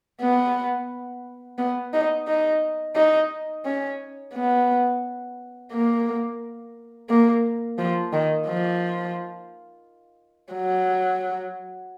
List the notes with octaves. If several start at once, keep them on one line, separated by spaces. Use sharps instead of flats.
B3
B3
D#4
D#4
D#4
C#4
B3
A#3
A#3
F3
D#3
F3
F#3